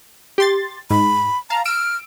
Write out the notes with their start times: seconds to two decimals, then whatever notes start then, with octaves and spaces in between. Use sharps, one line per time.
0.38 G4 C6 A6
0.91 G#2 B5
1.50 F5 A5 A#5
1.65 E6 F6 D7